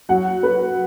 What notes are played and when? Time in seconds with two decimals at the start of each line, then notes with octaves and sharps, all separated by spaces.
0.09 F#3 F#5
0.43 F#3 B4